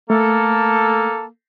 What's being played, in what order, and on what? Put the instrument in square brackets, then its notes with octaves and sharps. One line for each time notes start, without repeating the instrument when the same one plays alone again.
[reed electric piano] A3 [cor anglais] A#3 [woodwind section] A4